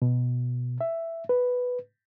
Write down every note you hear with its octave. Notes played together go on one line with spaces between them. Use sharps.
B2
E5
B4